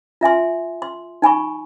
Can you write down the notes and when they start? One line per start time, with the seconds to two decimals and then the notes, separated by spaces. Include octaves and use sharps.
0.21 F4 E5 G#5 C6
0.82 C6
1.22 D#4 G#5 B5 C#6